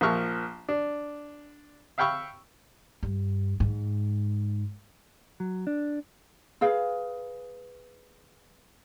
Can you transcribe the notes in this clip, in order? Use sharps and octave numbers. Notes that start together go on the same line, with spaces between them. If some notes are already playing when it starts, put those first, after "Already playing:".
A#1 F3 A#3 E5 C#6 F6
D4
E5 F5 G5 B5 C#6 E6
G2
G#2
F#3
D4
G#4 B4 F5